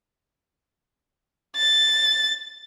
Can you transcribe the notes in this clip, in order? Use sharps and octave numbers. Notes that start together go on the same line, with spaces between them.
A6